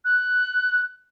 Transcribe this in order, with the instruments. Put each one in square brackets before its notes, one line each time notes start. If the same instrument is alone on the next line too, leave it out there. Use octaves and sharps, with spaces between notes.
[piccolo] F#6